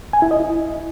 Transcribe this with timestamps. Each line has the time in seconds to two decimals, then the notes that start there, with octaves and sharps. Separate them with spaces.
0.13 G#5
0.22 E4
0.31 D#5
0.40 E4